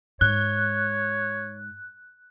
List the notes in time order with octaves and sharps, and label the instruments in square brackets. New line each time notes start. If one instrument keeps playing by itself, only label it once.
[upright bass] G#2 [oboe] C#5 [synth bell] F#6